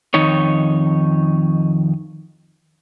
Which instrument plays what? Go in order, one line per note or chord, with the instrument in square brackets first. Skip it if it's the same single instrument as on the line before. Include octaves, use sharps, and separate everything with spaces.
[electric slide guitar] F2 D#3 D#4 C#5